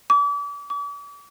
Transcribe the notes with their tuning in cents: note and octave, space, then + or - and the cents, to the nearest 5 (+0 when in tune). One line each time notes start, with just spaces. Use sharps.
D6 -40
D6 -45